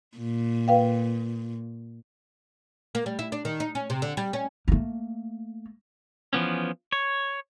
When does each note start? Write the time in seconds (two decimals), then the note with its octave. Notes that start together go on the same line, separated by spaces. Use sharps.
0.18 A#2
0.68 B4 F5 G5
2.95 A#3
3.06 G3
3.19 E4
3.32 D4
3.45 D#3
3.60 D#4
3.75 C#4
3.90 C3
4.02 D3
4.17 G3
4.33 C#4
4.68 A3 A#3
6.33 E3 F3 B3 C#4
6.92 C#5